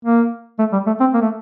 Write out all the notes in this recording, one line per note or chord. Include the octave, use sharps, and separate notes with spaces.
A#3
A3
G3
A3
C4
A#3
A3